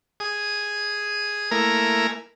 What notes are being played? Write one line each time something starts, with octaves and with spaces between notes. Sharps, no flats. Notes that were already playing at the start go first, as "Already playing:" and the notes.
G#4 D#6
A3 A#3 E4 A#4 G#5 A#5